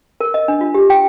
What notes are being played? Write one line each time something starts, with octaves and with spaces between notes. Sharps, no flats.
A#4
D#5
D4
F4
G4
G5